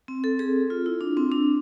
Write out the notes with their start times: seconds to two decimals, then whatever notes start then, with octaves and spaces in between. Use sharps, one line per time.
0.08 C4
0.24 A4
0.39 G#4
0.70 F4
0.86 E4
1.01 D4
1.17 C4
1.32 D4